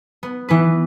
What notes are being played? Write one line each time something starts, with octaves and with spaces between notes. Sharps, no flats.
B3
E3 B3 B4